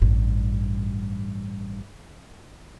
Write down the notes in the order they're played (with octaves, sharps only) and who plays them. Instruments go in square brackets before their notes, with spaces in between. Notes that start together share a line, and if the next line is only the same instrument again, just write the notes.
[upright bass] A1 G2